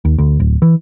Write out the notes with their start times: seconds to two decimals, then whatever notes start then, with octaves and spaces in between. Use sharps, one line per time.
0.05 D#2
0.18 D2
0.40 D1
0.62 E3